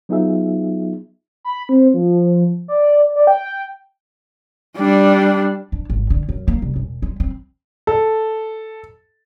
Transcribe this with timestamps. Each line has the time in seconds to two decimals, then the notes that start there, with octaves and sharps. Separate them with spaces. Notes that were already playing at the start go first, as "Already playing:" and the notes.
0.09 F#3 B3 D#4 F4 G#4 E5
1.45 B5
1.69 C4
1.94 F3
2.68 D5
3.16 D5
3.27 G5
4.77 G3 D4
5.72 D4
5.90 G#1
6.10 D3
6.29 F#2
6.48 A#3
6.62 C2
6.76 E1
7.02 G#3
7.20 C4
7.87 A4